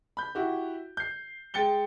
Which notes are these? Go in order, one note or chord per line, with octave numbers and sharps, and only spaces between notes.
B5 G6
E4 F#4 G4
G6 C7
G#3 G5 A6 C#7 G7